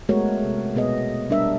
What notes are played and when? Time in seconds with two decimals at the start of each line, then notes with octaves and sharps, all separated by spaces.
0.09 G#3 A3 B3 F#4 A#4 C#5
0.44 C3
0.75 B2 B3 G#4 D#5
1.30 G3 D4 A#4 E5